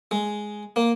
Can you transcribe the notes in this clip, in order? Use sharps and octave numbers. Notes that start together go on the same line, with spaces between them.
G#3
A#3